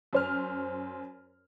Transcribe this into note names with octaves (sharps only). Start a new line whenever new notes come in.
F#2 C5 F6